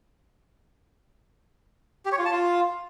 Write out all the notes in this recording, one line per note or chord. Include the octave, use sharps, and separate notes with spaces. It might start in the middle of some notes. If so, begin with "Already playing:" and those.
G4
C#5
F4
A5
F4